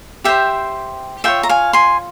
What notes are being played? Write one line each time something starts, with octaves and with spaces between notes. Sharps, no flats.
G4 C5 E5 G5
F4 A#4 C#5 E5 G5
A#5
F5 G#5
G#5 C6